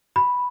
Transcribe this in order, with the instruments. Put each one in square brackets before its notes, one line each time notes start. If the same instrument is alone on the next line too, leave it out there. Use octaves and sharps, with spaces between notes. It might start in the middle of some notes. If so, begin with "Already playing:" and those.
[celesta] B5